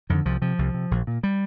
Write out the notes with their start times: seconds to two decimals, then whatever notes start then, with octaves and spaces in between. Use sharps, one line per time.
0.10 F2 D3 D#3
0.25 C2 F3
0.42 C3 F3
0.59 C2
0.74 C3
0.91 A#1
1.07 A#2
1.23 G3